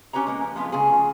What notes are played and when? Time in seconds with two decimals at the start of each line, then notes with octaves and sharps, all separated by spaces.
0.13 C#4 G4 B4 C#5 A#5
0.27 G#3 A#3
0.44 F3
0.56 F3 G#3 B3 F4 B4
0.72 C#3 A3 F4 G#4